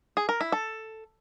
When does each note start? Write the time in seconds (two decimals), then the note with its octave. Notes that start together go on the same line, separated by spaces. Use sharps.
0.17 G#4
0.29 A#4
0.41 E4
0.52 A4